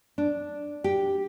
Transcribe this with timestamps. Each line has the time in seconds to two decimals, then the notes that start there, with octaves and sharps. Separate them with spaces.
0.18 D4
0.84 G4